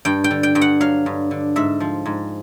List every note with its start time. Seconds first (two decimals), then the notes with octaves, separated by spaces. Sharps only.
0.05 G2 G5
0.24 G5
0.30 D3
0.43 G5
0.55 G2 G5
0.61 F#5
0.80 F#3 F5
1.06 G2
1.31 D3
1.56 G#2 E5
1.80 F3
2.06 G#2